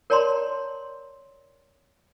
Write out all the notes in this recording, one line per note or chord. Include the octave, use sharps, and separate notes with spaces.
A#4 C#5 D5 A5 A#5 C6